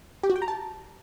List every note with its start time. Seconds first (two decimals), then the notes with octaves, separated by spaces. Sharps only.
0.23 G4
0.30 F#4
0.36 G5
0.42 A#5
0.48 A5